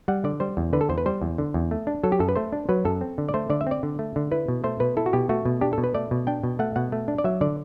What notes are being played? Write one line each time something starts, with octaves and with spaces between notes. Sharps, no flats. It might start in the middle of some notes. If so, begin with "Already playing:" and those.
G3 F#5
D3 D5
G3 C5
E2
D3 B4
A4
E2 C5
B4
G3 C5
E2
D3
E2
A3
D4
F#3 A4
G4
F#2 A4
B4
A3 C5
D4
F#3 B4
F#2 A4
C4
D3
D5
A3 C5
D3 D5
E5
C4 D5
D3
A3
D3
E4 B4
B2
A3 C5
B2 B4
E4 A4
F#4
B2 G4
A3 F#4
B2
D4 G4
A4
B2
B4
A3 D5
B2
D4 G5
B2
A3 F#5
B2 F#5
A3
D4
D5
F#3 E5
D3 D5